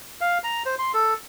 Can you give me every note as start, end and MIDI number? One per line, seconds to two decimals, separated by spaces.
0.21 0.38 77
0.44 0.63 82
0.66 0.75 72
0.79 0.92 84
0.94 1.14 69